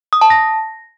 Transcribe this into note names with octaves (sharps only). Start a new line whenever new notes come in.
D#6
A5
A#6